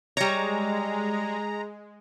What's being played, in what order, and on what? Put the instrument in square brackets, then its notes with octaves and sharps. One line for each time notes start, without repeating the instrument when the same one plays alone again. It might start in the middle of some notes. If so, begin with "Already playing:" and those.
[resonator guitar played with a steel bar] G3 C#5 [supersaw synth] G#3 [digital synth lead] A#5